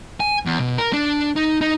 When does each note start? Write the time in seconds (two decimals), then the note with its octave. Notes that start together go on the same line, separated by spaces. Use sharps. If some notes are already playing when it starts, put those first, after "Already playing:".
0.20 G#5
0.46 E2
0.60 B2
0.78 A#4
0.93 D4
1.36 D#4
1.61 D#4